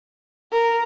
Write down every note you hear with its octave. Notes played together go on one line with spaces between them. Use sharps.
A#4